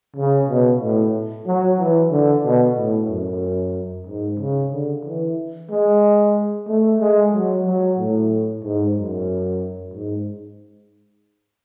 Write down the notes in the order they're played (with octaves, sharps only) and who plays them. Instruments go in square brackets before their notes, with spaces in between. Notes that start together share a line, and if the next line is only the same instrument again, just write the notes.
[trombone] C#3
B2
A2
F#3
E3
D3
B2
A2
F#2
G#2
C#3
D3
E3
G#3
A3
G#3
F#3
F#3
A2
G#2
F#2
G#2